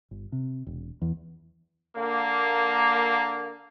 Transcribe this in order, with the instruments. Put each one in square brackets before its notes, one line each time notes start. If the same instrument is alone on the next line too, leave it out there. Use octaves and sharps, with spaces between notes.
[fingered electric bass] G1
C3
E1
E2
[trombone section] D3 A#3